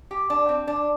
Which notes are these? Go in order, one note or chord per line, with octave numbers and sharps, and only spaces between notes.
G4
D4
C4
D4